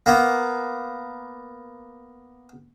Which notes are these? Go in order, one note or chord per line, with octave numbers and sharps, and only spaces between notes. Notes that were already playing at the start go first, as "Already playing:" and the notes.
A#3 B3